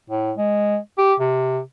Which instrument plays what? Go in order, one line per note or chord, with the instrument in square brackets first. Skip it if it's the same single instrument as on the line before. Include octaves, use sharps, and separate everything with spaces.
[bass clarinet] A2
G#3
G4
C3